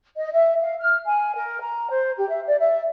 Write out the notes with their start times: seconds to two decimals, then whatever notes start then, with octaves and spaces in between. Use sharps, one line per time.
0.15 D#5
0.31 E5
0.60 F5
0.79 F6
1.06 G#5
1.35 A#4
1.61 A#5
1.89 C5
2.17 G4
2.29 E5
2.46 D5
2.59 E5